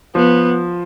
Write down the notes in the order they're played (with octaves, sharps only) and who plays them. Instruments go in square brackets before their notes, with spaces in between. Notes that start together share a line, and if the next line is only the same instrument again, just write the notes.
[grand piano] F3 [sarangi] B3